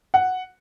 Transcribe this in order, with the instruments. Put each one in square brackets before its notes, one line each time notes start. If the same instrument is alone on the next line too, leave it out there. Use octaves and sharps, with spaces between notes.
[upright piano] F#5